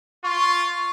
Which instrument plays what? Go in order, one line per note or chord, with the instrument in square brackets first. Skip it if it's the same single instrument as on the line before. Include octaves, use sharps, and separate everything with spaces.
[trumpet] F4 [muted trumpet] C#6